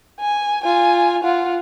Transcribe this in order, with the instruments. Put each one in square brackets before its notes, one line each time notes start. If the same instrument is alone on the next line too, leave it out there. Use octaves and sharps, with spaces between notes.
[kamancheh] G#5
F4 G#5
F4 F#5